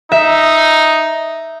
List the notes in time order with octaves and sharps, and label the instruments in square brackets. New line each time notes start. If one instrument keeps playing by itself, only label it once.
[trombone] D#4 [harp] E5